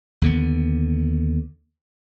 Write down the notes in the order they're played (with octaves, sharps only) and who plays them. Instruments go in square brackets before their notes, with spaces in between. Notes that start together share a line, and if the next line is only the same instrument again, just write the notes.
[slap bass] D#2 D3 B3